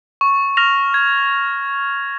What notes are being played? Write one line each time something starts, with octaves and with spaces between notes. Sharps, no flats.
C#6
F6 A#6 F7
G#6